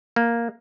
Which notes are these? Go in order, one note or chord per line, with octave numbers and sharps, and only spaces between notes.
A#3